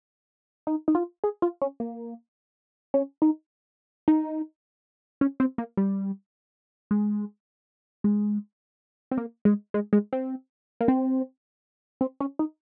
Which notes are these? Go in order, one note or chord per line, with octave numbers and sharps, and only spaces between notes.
D#4
D#4
F4
G#4
F4
C#4
A#3
C#4
D#4
D#4
C#4
C4
A#3
G3
G#3
G#3
C4
A#3
G#3
G#3
G#3
C4
A#3
C4
C4
C#4
D#4